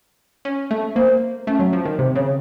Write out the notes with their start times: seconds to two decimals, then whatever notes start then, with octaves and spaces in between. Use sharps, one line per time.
0.45 C#4
0.71 A3
0.96 A#3 C5
1.47 A3 C#4
1.59 F#3
1.73 F3
1.85 D#3
1.99 C3 C5
2.15 C#3 C#5